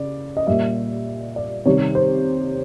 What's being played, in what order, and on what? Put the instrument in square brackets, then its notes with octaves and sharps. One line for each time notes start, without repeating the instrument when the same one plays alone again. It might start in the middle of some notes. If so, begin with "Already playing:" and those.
Already playing: [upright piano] C#3 D5
D#5
A#2 G3 E5
D5
C3 D#3 G3 C#5
C5